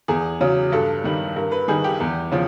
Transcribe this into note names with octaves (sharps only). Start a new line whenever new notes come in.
E2 G#4
C#3 F#3
G2 A4
D#3 G3
G2 A#4
B4
D#3 G3 G#4
G4
E2
C#3 F3